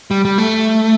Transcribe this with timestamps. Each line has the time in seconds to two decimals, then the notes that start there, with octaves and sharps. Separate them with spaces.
0.11 G3
0.25 G3
0.38 A3